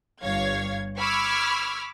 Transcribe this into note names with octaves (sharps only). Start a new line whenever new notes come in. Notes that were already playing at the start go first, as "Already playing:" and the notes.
G1 G2 C#5 F5 G#6
B5 C#6 D6 E6 F6 G#6